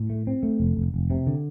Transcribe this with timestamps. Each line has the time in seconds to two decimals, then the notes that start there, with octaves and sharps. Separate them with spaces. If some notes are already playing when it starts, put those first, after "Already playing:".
Already playing: A2
0.10 A3
0.27 C4
0.43 A3
0.60 F1
0.77 F1
0.94 F1
1.10 C3
1.27 D3